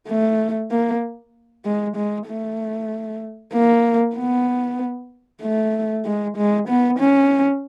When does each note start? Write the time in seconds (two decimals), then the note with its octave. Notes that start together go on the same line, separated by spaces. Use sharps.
0.08 A3
0.71 A#3
1.65 G#3
1.96 G#3
2.28 A3
3.54 A#3
4.16 B3
5.43 A3
6.05 G#3
6.37 G#3
6.68 B3
6.99 C#4